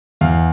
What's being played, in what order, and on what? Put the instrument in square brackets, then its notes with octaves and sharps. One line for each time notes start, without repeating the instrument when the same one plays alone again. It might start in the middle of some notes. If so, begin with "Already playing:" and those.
[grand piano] E2 F5